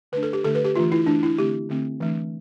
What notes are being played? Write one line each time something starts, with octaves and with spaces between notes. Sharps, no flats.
D3 A3 D4 B4
A4
G4
D3 A3 D4 A4
B4
G4
E3 A3 D4 F4
E4
E3 A3 D4
E4
D3 A3 C4 G4
D3 A3 C4
E3 A3 D4